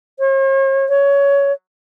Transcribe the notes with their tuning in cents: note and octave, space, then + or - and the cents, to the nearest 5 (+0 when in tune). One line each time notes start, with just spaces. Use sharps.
C#5 -45
C#5 +15